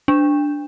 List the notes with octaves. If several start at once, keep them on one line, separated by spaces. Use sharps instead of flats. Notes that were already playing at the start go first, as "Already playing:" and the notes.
D4